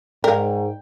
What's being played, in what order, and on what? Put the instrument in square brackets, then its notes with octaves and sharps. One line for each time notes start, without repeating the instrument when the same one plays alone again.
[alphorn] G#2 [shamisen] A#4 [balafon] D5 F5 [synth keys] G5